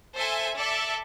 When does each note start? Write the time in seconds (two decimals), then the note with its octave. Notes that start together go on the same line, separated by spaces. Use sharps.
0.16 A4 C5 E5 G#5
0.55 A4 D5 E5